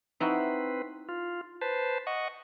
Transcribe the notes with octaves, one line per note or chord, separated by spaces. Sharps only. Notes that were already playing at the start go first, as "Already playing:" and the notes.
C4 D#4 E4 F#4 B4
F4
B4 C5 A5
D#5 F#5 C#6